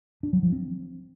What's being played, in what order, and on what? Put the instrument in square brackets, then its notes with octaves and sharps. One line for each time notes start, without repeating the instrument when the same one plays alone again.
[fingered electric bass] D4
F#3
F3
C4